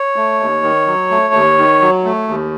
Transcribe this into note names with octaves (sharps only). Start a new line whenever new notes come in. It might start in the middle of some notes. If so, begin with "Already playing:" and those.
Already playing: C#5
A3
D#2
D#3
F#3
A3
D#2
D#3
F#3
A3
D#2